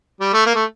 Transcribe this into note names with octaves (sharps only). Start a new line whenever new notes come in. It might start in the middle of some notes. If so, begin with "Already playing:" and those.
G3
A3
A#3
A3